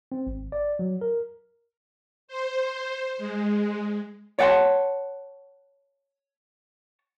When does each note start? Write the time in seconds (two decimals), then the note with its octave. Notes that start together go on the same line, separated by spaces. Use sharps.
0.12 C4
0.27 G#1
0.52 D5
0.79 F#3
1.01 A#4
2.28 C5
3.18 G#3
4.39 C#5 D5 F#5 G5 A5 C6